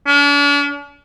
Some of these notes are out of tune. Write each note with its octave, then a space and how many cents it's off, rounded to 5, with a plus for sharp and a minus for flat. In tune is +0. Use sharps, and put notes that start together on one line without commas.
D4 -45